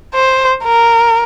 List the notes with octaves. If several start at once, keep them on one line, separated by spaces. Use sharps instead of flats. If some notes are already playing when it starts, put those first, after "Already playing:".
C5
A#4